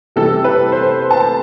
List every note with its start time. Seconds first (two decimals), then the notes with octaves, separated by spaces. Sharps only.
0.16 C3 E3 G3 A4
0.44 B4
0.72 C5
1.11 A5